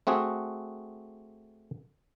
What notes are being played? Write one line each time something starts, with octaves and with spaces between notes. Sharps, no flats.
A3 C4 F#4 G#4